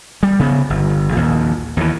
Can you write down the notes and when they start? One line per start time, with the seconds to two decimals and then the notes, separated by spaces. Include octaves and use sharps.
0.23 G3
0.39 C#3 B3
0.70 G1
1.12 A#1 D#2
1.77 D#2 E3